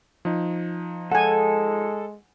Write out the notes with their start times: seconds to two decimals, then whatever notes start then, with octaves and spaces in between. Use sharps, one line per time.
0.25 F3 D#4
1.12 G#3 A4 F#5 G#5